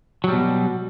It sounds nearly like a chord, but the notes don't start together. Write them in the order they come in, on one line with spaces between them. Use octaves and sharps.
F#3 G3 B2